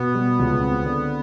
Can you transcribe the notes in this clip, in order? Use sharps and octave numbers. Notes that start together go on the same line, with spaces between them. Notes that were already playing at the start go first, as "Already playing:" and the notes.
Already playing: B2 B3
G3
C#2
C4
D3